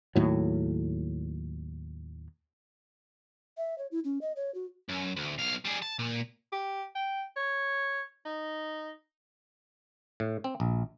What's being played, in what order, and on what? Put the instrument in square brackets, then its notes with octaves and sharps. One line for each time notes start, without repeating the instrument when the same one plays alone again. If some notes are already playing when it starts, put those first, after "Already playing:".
[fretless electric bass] D#2 A2 F#3
[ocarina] E5
C#5
E4
C#4
D#5
C#5
F#4
[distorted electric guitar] F#2
D2
B1 F5
G3 G#4
A5
A#2
[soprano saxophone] G4
G5
C#5
D#4
[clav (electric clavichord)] A2
C4
A#1